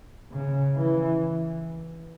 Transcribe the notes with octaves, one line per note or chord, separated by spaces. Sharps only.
C#3
E3